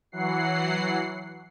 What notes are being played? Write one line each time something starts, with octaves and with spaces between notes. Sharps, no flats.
E3 F#3 F#5 C7